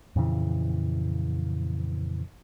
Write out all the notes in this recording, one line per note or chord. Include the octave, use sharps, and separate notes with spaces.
F2 A#2 C#3 E3